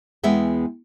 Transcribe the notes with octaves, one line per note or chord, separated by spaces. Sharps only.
E2 G#3 B3 E5 G5